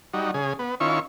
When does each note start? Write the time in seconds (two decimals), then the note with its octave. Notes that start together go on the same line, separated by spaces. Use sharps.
0.13 G3 D#4 F#4
0.34 C#3 G#4
0.59 B3
0.80 D#3 C#4 E4 F4 C#6